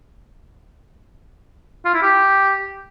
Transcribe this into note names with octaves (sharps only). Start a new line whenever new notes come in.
F4
E4
G4